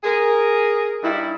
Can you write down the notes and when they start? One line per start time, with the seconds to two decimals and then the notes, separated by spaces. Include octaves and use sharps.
0.03 G#4 A#4
1.04 G2 D#4 E4